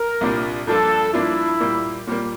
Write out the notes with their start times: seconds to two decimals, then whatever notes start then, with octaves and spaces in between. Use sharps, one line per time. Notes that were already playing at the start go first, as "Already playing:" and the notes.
Already playing: A#4
0.21 C2 A#2 G3 D4
0.67 G2 F3 A#3 D4 F4 A4
1.14 G2 F3 A#3 D4 E4 F4
1.60 A#2 G3 A#3
2.07 A#2 G3 A#3